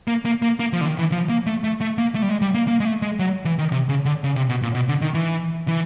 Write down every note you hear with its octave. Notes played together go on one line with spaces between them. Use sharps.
A#3
A#3
A#3
A#3
F3
D3
D#3
E3
F3
A#3
A3
A3
A3
A#3
A3
G3
G#3
G3
A#3
A#3
G#3
A3
G#3
F#3
E3
D#3
C3
C#3
D3
C#3
C3
B2
A#2
B2
D3
D#3
E3
E3